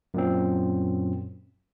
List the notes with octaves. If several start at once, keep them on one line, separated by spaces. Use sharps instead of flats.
F#2 A#2 C4